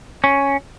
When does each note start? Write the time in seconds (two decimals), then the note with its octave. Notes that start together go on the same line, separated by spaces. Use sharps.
0.24 C#4